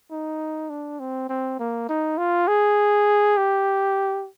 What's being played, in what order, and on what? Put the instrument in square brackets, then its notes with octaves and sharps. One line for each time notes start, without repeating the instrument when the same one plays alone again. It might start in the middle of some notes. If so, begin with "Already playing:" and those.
[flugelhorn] D#4
D4
C4
C4
A#3
D#4
F4
G#4
G4